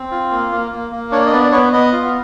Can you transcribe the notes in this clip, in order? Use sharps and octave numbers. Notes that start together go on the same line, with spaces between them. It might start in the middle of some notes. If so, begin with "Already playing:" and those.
Already playing: C4
F4
A#3
A#3
A#3
A#3
D4 C#5
D#5
B3 D5
B3 C#5
B3 D#5
F4